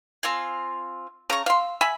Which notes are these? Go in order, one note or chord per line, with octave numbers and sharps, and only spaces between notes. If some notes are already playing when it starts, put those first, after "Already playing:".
C4 F4 G#5
C#3 A#5 C#6
F5 C6 E6
E5 G#5 B5